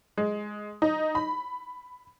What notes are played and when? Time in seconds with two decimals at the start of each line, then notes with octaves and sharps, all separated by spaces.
0.18 G#3
0.82 D#4
1.15 B5